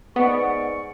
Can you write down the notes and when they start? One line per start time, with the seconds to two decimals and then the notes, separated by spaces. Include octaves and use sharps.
0.16 G#2 B3 D5 C#6